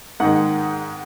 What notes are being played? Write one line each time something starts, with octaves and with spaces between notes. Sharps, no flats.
G#2 D#3 G#3 F#5